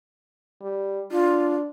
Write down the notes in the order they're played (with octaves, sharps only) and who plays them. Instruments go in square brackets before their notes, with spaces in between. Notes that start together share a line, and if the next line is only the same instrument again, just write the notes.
[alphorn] G3
[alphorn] D4 [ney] F4